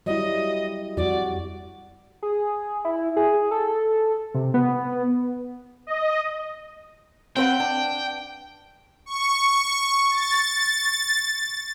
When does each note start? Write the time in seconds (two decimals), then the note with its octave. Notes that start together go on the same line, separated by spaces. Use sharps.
0.06 F#3 G3 E4 D#5
0.97 F2 G3 F#4 D5
2.22 G#4
2.85 E4
3.16 G#4
3.51 A4
4.34 C3
4.54 B3
5.87 D#5
7.36 C4 B4 F#5 G5
7.60 D4
9.06 C#6
10.11 A6